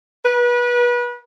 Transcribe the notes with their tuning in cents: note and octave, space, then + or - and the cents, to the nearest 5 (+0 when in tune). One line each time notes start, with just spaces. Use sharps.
B4 -30